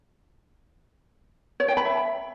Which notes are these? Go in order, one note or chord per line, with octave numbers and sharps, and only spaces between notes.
C#5
G5
B5
E5